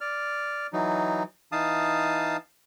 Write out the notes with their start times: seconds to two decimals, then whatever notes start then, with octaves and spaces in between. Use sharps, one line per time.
0.01 D5 F6
0.73 E3 F#3 D#4
1.52 E3 D#4 F5 A5 D#6